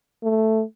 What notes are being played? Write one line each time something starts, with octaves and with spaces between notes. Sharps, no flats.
A3